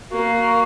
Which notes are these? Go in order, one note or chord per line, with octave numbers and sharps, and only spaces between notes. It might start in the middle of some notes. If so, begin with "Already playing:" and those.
A#3 F#4